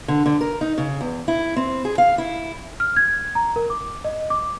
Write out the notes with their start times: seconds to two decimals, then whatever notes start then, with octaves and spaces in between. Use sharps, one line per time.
0.08 D3
0.26 D3
0.41 A#4
0.61 D#4
0.78 C#3
1.01 E2
1.28 E4
1.56 C4
1.85 G#4
1.98 F5
2.18 E4
2.80 F6
2.96 G#6
3.35 A#5
3.56 A#4
3.70 D6
4.05 D#5
4.30 D6